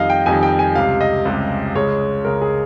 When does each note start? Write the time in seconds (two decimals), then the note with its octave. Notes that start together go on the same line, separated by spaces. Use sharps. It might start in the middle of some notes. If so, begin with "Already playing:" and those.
Already playing: F2 D#3 G3 D#5 F5
0.10 G5
0.26 F2 D#3 G3 G#5
0.43 G5
0.59 G#5
0.75 C#2 C3 G3 F5
1.01 D#5
1.25 C#2 C3 G3
1.75 C#2 C#3 G#3 C#5
2.25 C#2 C#3 G#3 A#4
2.42 G#4